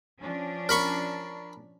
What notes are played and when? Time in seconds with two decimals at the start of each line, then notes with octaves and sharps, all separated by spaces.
0.21 F3 C#4 D4
0.69 A#4 B5 C#6